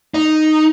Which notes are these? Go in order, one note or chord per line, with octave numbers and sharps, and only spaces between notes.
D#4